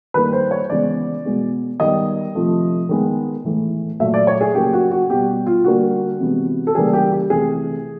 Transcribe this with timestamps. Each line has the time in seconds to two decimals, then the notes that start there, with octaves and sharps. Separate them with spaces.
0.14 D#3 G3 A#3 B4
0.33 C5
0.51 C#5
0.70 C#3 E3 G#3 B3 D5
1.25 B2 G#3 B3
1.80 D#3 G3 B3 D#5
2.35 C3 F3 A3
2.89 D#3 G#3 B3
3.44 A2 E3 A3
4.00 A#2 F#3 A3 E5
4.14 D5
4.27 C#5
4.41 G#4
4.54 C#3 F#3 A#3 G4
4.73 F#4
4.92 F#4
5.10 B2 G3 B3 G4
5.46 F4
5.65 D3 G3 A#3 F#4
6.20 C3 E3 G#3 B3
6.67 A4
6.75 C#3 E3 G3 A#3 G#4
6.93 G4
7.12 G4
7.30 C3 E3 A3 G#4